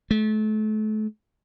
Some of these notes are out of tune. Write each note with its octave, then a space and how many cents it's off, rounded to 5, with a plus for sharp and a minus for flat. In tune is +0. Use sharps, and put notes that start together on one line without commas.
A3 -35